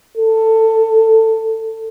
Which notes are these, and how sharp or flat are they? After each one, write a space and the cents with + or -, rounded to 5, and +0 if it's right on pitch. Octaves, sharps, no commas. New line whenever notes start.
A4 +20